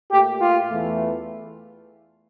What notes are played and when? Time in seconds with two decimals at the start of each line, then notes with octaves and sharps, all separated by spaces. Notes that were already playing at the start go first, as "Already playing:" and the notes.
0.12 A#2 A3 G4
0.40 F4
0.69 E2 E3 A3